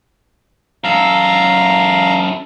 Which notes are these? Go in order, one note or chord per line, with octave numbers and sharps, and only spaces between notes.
F#2 A4 F5 A#5